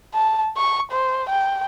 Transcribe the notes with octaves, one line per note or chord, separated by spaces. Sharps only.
A5
C#6
C5
G5